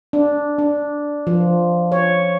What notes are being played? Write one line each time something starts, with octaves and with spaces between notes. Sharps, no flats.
D4
D4
F3
C#5